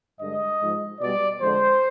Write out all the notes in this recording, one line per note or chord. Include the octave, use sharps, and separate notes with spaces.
G2 D3 G#3 D#5
G#2 F3 G#3
B2 G3 D5
F2 D3 G#3 C5